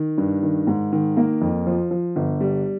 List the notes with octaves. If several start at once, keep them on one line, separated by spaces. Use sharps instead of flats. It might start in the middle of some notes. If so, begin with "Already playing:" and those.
Already playing: D#3
G2
D#3
G#2
D#3
A#3
F2
F3
F3
G1
G3